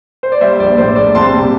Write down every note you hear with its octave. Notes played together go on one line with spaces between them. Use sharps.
C5
D5
G3 C5 E5
A#1 D5
A2 C5
A#1 D5
C2 A5 C6
C3